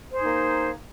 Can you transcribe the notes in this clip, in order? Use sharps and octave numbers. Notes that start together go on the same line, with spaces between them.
A#3 D#4 G#4 C5